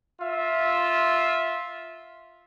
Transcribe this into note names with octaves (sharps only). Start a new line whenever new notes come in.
F4 E5